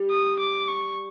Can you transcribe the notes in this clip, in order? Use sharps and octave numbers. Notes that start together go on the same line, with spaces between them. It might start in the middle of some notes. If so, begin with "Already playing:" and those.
Already playing: G3
D#6
D6
C#6